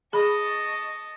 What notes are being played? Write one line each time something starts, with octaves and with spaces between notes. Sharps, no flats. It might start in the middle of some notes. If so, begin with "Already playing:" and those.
G#4 D#5 A5 B5 C#6